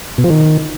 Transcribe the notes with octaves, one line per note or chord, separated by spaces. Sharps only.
B2
F3
D#3